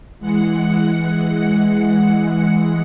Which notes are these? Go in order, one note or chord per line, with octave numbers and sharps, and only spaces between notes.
E3 G#3 F#5 C#7